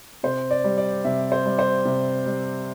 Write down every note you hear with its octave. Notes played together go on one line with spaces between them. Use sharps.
C3 C5
D5
G3
D5
C3 E5
C5
G3
C5
C3
G3